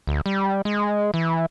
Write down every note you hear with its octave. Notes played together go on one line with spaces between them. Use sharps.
D2
G3
G#3
E3